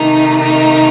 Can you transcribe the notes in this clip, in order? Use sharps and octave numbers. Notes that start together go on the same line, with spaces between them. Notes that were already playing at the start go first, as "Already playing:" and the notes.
Already playing: C3 D#3 A3 D#4
D#4